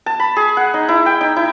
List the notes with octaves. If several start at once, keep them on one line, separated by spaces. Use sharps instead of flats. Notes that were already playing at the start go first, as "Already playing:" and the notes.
A5
B5
G#4
F#5
D#4
E4
G5
D#4
E4